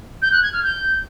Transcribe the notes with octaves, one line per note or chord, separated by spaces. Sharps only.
G6
F#6
G#6
F6
G6